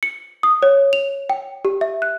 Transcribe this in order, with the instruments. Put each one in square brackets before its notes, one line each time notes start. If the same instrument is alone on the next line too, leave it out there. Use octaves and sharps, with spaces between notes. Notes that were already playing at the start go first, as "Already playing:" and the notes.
[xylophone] C#7
D#6
C#5
F7
G5
G4
E5
F#6